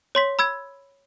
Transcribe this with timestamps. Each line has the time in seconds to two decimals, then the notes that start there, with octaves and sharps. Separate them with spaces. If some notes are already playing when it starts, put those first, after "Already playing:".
0.15 C#5 C6 B6
0.39 B5 E6 G#6